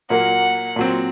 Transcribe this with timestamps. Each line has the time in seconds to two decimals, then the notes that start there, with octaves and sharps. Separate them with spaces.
0.10 A#2 F#3 A#3 F#5
0.76 A#2 F#3 C4